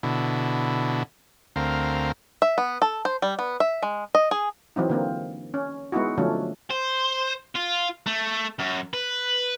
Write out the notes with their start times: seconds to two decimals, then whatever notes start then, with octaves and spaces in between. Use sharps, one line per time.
0.03 B2 D3 E4
1.56 D2 C4 A#4 F5
2.42 E5
2.58 B3
2.82 A4
3.05 C5
3.22 G3
3.39 B3
3.60 E5
3.82 G#3
4.15 D#5
4.31 G#4
4.76 E3 F#3 C4 D#4
4.90 D3 A#3 C4
5.54 C#4
5.92 G#3 B3 D#4 E4 F#4
6.18 D3 F3 F#3 A3 C#4 D4
6.71 C5
7.55 F4
8.06 A3
8.60 F#2
8.93 B4